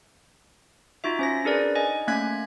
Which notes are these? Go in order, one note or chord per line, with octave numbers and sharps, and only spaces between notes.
D#4 F4 F#4 E5
C#4 C5 A#6
D4 D#4 G#4 A#4 B4 D5
D#5 G#5
A3 A#3 C#4 F#6 G#6 B6